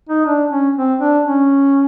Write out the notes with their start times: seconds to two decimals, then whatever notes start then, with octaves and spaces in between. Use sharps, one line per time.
0.09 D#4
0.26 D4
0.51 C#4
0.76 C4
1.01 D4
1.26 C#4